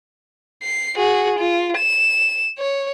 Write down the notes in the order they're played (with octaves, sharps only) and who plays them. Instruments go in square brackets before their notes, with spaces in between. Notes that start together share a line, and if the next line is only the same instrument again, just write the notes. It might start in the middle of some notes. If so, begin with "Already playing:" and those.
[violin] C7
F#4 G#4
F4
E7
C#5